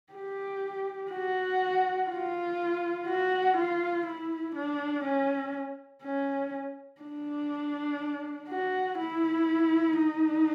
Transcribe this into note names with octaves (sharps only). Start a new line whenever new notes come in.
G4
F#4
F4
F#4
F4
E4
D4
C#4
C#4
D4
F#4
E4
D#4